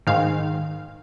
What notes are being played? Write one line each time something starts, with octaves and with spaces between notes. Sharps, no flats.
G#2 D#3 G#3 F5